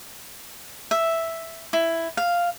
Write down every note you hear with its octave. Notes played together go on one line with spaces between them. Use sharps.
E5
E4
F5